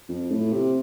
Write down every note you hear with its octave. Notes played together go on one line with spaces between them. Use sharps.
F2
A2
C3